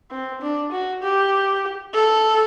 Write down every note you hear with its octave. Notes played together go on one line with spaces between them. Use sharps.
C4
D4
F#4
G4
A4